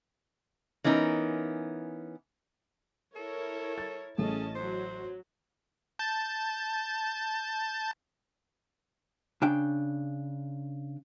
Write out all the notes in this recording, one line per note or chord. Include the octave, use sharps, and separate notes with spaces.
E3 B3 C#4 D#4 A#4
E4 A4 A#4 C#5
A6
A1 A3 C#4 G#4 D#5 A5
F#3 C5
A5 G6 A6
C#3 D4 G5